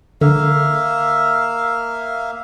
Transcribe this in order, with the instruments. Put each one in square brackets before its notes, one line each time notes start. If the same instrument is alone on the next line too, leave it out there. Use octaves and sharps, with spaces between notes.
[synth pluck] D3 [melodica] A#3 E5 F5